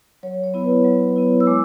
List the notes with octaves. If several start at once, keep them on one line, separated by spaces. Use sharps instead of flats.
F#3 C#5
C#5
B3 E4
B4
F#3
B3 E4
E6
G#3 D6